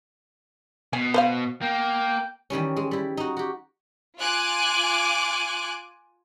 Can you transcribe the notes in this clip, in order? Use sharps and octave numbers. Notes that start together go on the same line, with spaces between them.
B2 G#5
B4 C5 F5
A#3 G5
D#3 E3 G3 C#4
G#3
G3 E4
D#4 F#4
F#4 G4
F4 G#5 D6 F#6